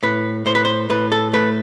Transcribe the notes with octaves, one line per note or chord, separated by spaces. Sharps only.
A2 B4
A2 C5
B4
C5
A2 B4
A4
A3 B4